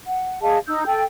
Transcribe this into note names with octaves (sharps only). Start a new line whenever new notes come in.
F#5
G#4 D#5 F5 A5
D#4 E6 G6
A4 G5